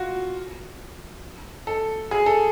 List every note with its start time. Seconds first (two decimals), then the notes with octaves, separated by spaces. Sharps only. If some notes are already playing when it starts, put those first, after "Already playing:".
Already playing: F4 F#4
1.67 A4
2.11 G#4
2.26 A4